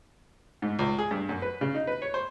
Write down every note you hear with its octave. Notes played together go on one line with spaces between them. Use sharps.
G#2
C#2
G#4
G2
F#2
B4
C#3
D#4
B4
C#5
C5